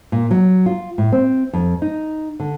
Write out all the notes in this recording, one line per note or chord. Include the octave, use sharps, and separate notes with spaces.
A#2
F#3
F4
A2
C4
F2
D#4
D3